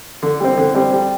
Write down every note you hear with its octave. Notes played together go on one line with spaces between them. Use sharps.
D3
G3 C4
D3
G3 C4
G3